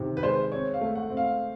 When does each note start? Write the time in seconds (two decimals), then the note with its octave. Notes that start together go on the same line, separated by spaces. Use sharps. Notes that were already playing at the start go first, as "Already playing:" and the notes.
Already playing: C3 D#3
0.17 B4
0.23 G#3 C5
0.52 C4 C#5
0.74 F5
0.81 A3
0.95 F#5
1.10 C4
1.17 F5